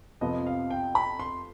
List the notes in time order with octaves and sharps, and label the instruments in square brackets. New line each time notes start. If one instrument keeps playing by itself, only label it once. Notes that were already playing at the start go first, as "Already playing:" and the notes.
[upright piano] F2 C3 F3 B3 [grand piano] D#5
[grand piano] F5
G5
B5
C6